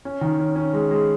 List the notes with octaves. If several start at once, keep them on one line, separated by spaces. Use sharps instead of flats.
C#4
D#3
C#4
C#4
G#3
G#3